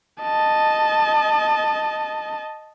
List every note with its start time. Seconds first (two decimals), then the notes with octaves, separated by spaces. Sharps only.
0.22 D#5 A5